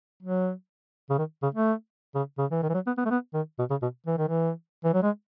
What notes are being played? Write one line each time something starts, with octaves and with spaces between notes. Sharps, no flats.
F#3
C#3
D#3
C#3
A3
C#3
C#3
E3
D#3
E3
F#3
B3
B3
A3
B3
D#3
B2
C#3
B2
E3
D#3
E3
E3
F#3
G#3